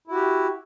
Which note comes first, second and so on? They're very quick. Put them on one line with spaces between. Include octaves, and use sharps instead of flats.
E4 F#4 G4